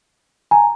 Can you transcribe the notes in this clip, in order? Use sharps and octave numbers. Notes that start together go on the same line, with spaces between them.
G#5 A#5